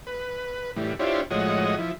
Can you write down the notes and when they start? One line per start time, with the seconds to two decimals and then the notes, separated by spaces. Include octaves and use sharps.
0.07 B4
0.76 A2 E3 G3
0.99 D4 E4 F4 G4 C5 C#5
1.31 A2 F3 G#3 F#4 C#5 D#5
1.79 F3 E4